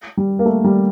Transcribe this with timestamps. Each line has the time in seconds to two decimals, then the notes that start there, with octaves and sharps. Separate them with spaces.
0.17 G3
0.39 A#3
0.46 A3
0.64 G3